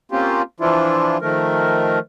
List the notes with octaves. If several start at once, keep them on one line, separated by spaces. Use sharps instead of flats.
A#3 C4 C#4 F4 G4
E3 F3 D4 E4 F4
D#3 F3 A3 A#4